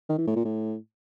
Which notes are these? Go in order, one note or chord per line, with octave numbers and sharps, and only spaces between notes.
D#3
E3
A2
A#2
A2